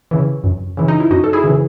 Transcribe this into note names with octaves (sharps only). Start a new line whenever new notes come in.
C#3 E3
F#2
C#3 E3
D#4
E4
F#2 D#4 F#4
A4
E4 G#4
C#3 E3